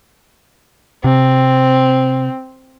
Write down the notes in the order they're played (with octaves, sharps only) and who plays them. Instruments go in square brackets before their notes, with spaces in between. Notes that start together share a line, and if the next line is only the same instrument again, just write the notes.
[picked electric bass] C3 [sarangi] C4